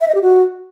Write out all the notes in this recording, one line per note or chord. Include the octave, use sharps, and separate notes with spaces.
E5
D#5
G4
F#4